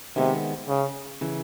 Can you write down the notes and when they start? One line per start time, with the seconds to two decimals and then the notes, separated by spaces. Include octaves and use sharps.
0.16 C3 D#3 G#3 B3
0.68 C#3
1.21 C#3 E3